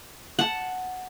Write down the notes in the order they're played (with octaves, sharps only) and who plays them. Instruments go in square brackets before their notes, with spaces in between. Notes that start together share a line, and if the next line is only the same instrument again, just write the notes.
[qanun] F#5 A5